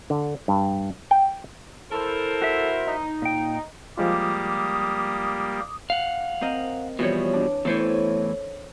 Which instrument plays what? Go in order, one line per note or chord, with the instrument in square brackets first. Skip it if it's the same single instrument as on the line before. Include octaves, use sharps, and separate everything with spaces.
[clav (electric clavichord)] D3
G2
G5
[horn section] E4 A#4 C5 [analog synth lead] A4
[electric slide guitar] F#4 E5
[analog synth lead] D#4
[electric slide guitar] A#2 G5
[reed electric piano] F3 G#3 F4 [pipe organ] G3 A#3 G4 [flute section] D6 D#6
[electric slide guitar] F5 F#5
[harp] C4 A#4 D#5
[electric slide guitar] B2 F3 G3 [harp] E3 C#5
[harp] D4
[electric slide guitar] E2 A2 E3 [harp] A4 C5 C#5